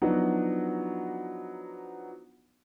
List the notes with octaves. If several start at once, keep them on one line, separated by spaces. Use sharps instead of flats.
F3 F#3 B3 D4 D#4 F#4